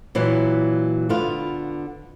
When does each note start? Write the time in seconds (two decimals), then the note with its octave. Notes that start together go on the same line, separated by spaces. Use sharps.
0.15 A#2 E3 F#3
1.09 D3 B3 F4